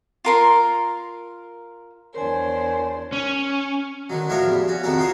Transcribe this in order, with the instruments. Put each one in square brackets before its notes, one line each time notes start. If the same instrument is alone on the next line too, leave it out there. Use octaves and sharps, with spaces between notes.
[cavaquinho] F4 A#4 C6
[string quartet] E2 D4 C5 [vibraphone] A#4 G#5 [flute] C#5
[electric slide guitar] C#4
[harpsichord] D3 D#3 F#3
A2 F3 D4 F#4 A#4 C#5
E2 G3
C#4 F#4
C2 F2 D#3 F#4 A4 A#5
F4 G#4 A#4 C5 C#5